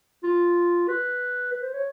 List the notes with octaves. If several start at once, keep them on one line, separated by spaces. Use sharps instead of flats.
F4
B4
B4
C5
C#5